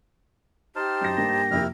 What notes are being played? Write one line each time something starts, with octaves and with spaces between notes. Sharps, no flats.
D#4 G4 C5 A5 F6
F#2 A#6
G2 A#3 C6 A#6
F2 C3 A#3 E4 F6